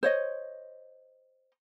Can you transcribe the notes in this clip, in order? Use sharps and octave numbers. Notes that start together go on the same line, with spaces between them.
C5 C#5 D#5